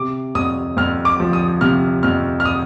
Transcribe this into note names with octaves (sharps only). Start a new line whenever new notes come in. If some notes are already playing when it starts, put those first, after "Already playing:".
Already playing: C3 D6
F2 D#6
F2 F6
D6
F3
D#6
C3 F6
F2 F6
F6
D#6